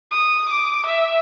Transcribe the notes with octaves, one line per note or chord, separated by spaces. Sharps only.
D#6
D6
E5